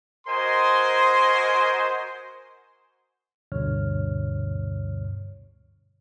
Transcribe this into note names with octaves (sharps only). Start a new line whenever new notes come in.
F#4 A#4 C5 D#5 G#5 C6
D2 G2 B2 D3 C#5 F6